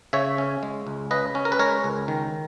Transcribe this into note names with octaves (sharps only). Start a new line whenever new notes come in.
C#3 C#5 E5
C#4
G#3
C#2
C#3 B4 D#5
C#4
A#4
B4
G#3 A#4 C#5
C#2
D#3